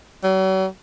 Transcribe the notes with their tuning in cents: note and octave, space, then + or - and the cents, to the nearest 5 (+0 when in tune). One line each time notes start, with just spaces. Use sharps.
F#3 +40